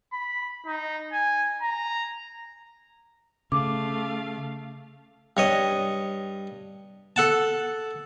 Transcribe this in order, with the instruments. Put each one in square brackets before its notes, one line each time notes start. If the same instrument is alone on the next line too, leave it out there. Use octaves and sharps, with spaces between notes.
[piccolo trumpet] B5
D#4
G#5
A#5
[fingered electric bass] C#3 [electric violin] A3 F5 [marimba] D6
[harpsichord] G2 C#5 D#5
A4 F#5 A5